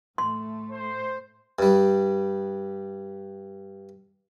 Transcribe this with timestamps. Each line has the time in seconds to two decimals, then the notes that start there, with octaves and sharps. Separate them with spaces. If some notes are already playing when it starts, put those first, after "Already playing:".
0.18 A2 A3 C6
0.71 C5
1.59 G2 G3